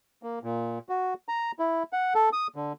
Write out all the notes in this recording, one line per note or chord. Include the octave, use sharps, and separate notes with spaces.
A#3
A#2
F#4
A#5
E4
F#5
A4
D#6
D3